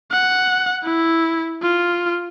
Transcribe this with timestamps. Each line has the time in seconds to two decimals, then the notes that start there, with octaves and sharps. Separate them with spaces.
0.12 F#5
0.84 E4
1.62 F4